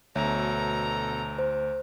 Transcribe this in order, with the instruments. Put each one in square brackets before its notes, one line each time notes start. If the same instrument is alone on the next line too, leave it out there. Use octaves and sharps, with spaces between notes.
[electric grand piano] D2 [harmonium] B2 A4 [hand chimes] C#5 E5 [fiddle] A#5
[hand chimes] C5